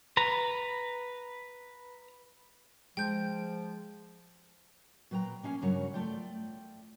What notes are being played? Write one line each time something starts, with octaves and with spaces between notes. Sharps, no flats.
B4 A#5
F3 G#3 G5 G6
A#2 F#3 B4 G5 A#5
A#3 C#4 F5 F#5 G#5
G2 C#3 F#3 A#4 C#5
A3 F4 D5 G5